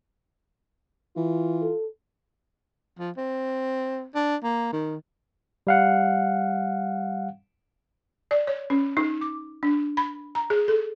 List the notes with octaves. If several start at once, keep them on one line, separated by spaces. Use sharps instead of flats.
E3 F4
A4
F3
C4
D4
A#3
D#3
G3 F5 F#5
D5
C#5
C#4
D#4
D6
D4
B5
A#5
G#4
A4